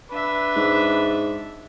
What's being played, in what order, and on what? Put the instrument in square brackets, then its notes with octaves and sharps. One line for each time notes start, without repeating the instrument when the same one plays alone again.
[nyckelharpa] D4 E5 [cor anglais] B4
[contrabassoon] G#2